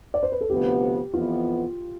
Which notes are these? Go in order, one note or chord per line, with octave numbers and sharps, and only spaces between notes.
D5
C5
B4
A4
D2 C3 F3 B3 G4
F2 E3 B3 F4